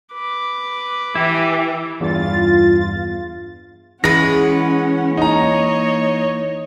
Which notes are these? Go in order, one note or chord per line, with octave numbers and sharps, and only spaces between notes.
B4 D6
E3 E4 G4
E2 G2 F4 A6
E3 G#3 C#4 B4 F#5 A#6
A#3 D#4 C#5 D#5 A#5